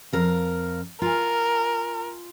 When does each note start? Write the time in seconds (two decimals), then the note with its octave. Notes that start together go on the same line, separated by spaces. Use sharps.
0.13 F2 A#4 F5
1.02 F4 A#4 G#5